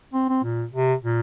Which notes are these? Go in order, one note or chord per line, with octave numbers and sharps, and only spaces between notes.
C4
C4
A#2
C3
A#2